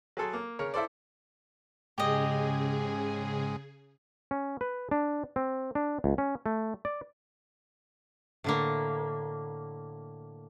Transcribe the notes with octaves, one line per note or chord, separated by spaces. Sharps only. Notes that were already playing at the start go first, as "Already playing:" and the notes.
F#3 G#4 A4 C6
A#3
C#3 A#4 C#5
E4 A4 C5 D5
G#2 C#3 G#3 G4 G#4 D#5
C#4
B4
D4
C4
D4
C#2
C#4
A3
D5
A2 D3 A#3